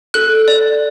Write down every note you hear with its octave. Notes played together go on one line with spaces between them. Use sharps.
A4 F#6
D5